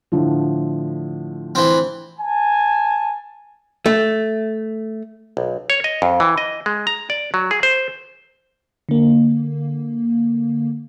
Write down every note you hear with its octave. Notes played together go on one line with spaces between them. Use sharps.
A2 D3 F3
E3 C4
G#5 A5
A3
B1
C#5
D#5
F2
E3
D#5
G#3
A#5
D5
F#3
G#4
C5
D3 A#3